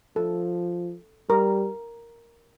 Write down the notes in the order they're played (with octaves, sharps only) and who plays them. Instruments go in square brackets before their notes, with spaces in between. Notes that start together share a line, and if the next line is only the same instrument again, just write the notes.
[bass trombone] F3 [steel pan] A4
[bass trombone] G3 [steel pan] A#4